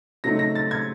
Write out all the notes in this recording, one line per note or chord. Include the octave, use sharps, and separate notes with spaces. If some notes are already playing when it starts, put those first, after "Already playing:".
C#3 F#3 A3 C4 D#4 A#6
A#6
A6
G#6